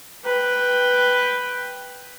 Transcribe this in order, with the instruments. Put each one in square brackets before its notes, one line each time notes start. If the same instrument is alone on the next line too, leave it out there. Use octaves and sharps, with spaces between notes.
[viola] B4 G5